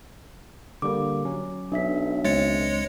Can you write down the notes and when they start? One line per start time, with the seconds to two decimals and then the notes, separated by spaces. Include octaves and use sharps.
0.82 D3 G3 A#3 D6
1.25 F#3 C#4
1.72 B1 D4 E5 B6
2.25 C#2 G#3 C4 C#5 A6 C#7